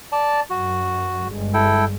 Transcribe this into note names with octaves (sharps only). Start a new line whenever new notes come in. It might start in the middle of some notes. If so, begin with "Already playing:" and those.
D5 A5
F#2 F#4
G1 G2 G#3
E4 A4 G5